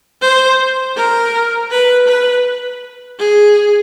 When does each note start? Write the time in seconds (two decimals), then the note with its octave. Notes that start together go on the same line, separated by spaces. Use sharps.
0.21 C5
0.96 A#4
1.71 B4
2.07 B4
3.19 G#4